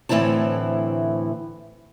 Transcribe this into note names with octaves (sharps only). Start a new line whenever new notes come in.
D2 A2 E3 C4 E4 A5